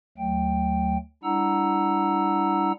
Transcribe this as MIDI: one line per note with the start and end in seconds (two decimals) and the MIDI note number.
0.18 0.97 38
0.18 0.97 54
0.18 0.97 57
0.18 0.97 79
1.23 2.72 55
1.23 2.72 62
1.23 2.72 64
1.23 2.72 78
1.23 2.72 82
1.23 2.72 88